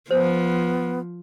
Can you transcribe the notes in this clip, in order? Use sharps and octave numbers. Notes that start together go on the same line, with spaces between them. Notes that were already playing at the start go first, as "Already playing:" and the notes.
F3 B3 C5